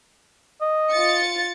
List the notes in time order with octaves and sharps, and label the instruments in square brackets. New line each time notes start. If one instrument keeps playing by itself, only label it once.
[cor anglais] D#5
[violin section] F4 A6 C#7